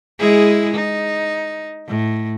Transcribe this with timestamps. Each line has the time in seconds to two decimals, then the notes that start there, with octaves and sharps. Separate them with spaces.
0.19 G#3 E4 G#4
0.74 D#4
1.88 A2